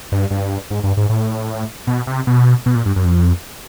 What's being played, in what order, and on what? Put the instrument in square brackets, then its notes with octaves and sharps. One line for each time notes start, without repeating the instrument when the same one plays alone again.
[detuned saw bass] G2
G2
G#2
G2
G#2
A2
B2
C3
B2
B2
A#2
G2
F#2
F2